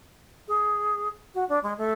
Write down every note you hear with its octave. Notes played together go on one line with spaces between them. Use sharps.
G#4
F#4
D4
G#3
A3